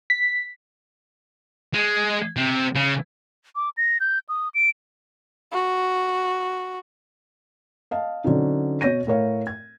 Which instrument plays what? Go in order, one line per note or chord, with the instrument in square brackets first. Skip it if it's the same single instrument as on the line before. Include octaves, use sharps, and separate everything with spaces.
[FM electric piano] B6
[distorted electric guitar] G#3
C3
C#3
[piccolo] D6
A#6
G6
D#6
D7
[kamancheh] F#4
[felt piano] D#5 F5 A5
D3 F#3 C4 C#4 D#4
B2 C#5 G6 A#6 D#7
A2 A#4 C#5 F5
G#6